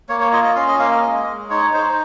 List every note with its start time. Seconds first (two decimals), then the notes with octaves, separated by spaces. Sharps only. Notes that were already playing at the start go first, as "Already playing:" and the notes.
0.09 A#3 C#5
0.20 C#5
0.33 F4 D#5
0.44 D#5
0.55 C#4 F5
0.68 D#5
0.79 A#3 F5
0.92 D#5
1.03 G#3
1.27 G#3
1.50 D#4 C#5
1.73 D#4 C5